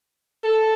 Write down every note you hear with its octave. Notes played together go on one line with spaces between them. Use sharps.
A4